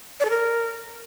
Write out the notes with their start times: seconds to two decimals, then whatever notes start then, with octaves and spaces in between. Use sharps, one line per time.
0.20 D5
0.25 A4
0.30 A#4